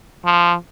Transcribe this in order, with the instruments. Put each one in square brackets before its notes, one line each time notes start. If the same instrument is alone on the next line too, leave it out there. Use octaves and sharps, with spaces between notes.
[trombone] F3